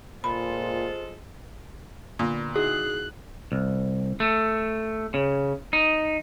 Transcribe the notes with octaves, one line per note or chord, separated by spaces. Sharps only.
A#2 G#3 F4 A4 C5 B5
A#2 D3 B3 A#4
D#4 E4 F#4 G#4 F#6
C2
A3
C#3
D#4